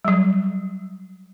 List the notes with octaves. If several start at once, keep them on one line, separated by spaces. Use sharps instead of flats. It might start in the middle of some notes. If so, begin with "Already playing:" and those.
F#3 G3